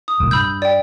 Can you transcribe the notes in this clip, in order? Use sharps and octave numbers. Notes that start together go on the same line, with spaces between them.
D#6
E1 C2 A2
G2 B5 E6 G6
D5 G5